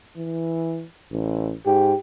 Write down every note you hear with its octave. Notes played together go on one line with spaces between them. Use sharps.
E3
A1
G#2 G4